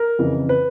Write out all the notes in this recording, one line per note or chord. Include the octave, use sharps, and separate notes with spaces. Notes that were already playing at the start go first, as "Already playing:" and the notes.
Already playing: A#4
F2 C#3 E3
B4